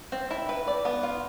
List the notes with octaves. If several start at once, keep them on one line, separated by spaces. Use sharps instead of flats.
C4
E4
B4
D5
B3
F4